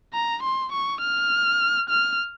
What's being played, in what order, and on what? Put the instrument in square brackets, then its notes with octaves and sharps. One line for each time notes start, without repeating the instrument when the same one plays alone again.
[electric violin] A#5
C6
C#6
F6
F6